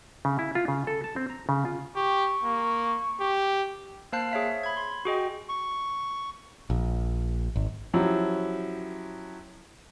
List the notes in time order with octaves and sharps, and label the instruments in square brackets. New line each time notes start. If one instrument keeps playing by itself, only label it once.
[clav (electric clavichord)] C#3
E4
F4
C#3
A4
A5
C4
A#5
C#3
F4
[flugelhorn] G4 [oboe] C#6
[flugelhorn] A#3
G4
[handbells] A#3 C5 F5 A5 F#6 C7
G#4 C#5 E5 F5
B5 G#6
C6
F#4 G#4 D#5 G5
[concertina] C#6
[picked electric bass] A#1
G#1
[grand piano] F3 F#3 C#4 E4 G4